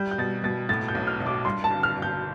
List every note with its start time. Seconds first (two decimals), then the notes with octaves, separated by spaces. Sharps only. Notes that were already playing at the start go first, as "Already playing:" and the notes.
Already playing: G3 G6
0.11 G6
0.18 B2 A6
0.44 B2 A6
0.69 A2 A6
0.88 G6
0.95 B1
1.07 F6
1.20 B1
1.26 D6
1.45 G2 C6
1.64 A5
1.71 G1
1.83 F6
1.96 G1
2.02 G6